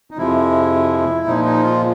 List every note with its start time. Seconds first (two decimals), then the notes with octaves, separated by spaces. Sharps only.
0.11 D#4
0.17 F2 C3 F3 G#3 E4
1.26 A#2 F3 G#3 D#4
1.44 D#4
1.63 F4